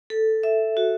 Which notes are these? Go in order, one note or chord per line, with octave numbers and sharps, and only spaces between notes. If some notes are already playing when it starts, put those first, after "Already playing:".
A4
E5
F#4